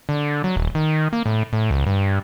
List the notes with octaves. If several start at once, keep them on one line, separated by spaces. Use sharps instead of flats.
D3
F#3
D#1
D#3
A#3
A2
A2
C#2
G2